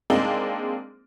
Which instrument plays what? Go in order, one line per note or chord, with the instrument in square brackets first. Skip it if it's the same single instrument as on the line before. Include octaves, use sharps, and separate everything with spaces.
[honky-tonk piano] G#3 A#3 C4 D4 D#4